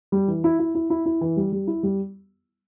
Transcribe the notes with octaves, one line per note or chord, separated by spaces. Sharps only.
G3
E3
E4
E4
E4
E4
E4
E3
G3
G3
E4
G3